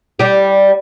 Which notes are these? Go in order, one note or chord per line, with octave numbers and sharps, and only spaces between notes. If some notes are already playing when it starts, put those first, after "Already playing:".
G3 G4